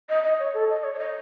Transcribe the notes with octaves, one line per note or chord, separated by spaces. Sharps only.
D#5
D#5
C#5
A4
D#5
C#5
C#5
D#5